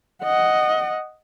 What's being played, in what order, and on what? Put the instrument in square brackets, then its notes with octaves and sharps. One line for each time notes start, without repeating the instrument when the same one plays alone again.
[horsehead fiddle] D#5 F#5